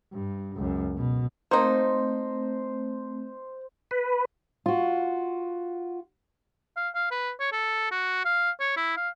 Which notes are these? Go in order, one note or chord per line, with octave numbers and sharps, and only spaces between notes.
G2
C#2 F#2
B2
A3 A#3 C4 D#4 C5
B4
F4 F#4
F5
F5
B4
C#5
A4
F#4
F5
C#5
E4
F5